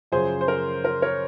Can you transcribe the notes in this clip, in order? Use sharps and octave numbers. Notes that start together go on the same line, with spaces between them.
F#2 C#3 F3 G#4 C5
C5
A#4
A#4
A#4 C#5